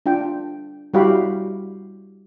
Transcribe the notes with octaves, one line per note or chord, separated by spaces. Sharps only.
D4 F4 G5
G3 E4 F#4 G4 F5 B5